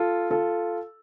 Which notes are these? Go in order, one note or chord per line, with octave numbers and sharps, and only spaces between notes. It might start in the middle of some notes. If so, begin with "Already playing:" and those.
Already playing: F4 A4
F4 A4